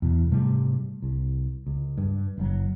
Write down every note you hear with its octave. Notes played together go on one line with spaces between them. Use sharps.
E2 B2
G#2 C3 G3 A3
C2
C#2
G2
F#1 C3 F#3